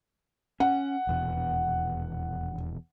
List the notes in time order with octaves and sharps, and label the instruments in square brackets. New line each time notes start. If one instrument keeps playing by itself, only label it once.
[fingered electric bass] C#4 [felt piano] F#5
[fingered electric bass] D#1 E2 B2